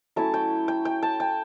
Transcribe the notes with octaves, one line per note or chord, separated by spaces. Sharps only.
F#3 A3 C#4 E4 A5
G5
G5
G5
A5
G5